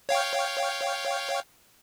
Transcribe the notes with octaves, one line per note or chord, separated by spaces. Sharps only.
C#5 F5 G5